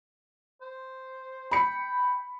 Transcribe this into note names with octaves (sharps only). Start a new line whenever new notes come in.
C5
G5 B5 C#7